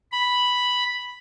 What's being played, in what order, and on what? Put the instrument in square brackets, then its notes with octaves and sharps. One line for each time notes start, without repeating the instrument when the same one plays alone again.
[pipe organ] B5